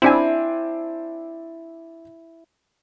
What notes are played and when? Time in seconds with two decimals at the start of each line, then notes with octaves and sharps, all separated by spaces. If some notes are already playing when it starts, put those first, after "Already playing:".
0.02 C4 D4 E4 G#5